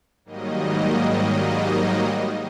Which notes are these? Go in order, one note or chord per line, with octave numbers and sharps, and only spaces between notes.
G#2 D#3 F#3 G3 A#3 D#5